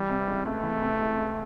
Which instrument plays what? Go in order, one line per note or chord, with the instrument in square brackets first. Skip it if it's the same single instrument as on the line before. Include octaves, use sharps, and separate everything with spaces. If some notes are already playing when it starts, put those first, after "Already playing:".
Already playing: [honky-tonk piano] E3 [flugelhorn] G3
[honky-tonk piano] C3
C#2
[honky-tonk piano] C#2 [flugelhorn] A3
[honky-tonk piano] E3
C3
C#2
C#2